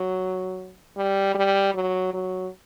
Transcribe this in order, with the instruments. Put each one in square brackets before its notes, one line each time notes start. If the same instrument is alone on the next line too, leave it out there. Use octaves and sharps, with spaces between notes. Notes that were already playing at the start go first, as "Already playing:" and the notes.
Already playing: [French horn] F#3
G3
G3
F#3
F#3